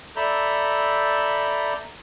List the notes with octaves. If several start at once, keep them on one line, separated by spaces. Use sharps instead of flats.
A4 D5 E5 A#5 B5 G6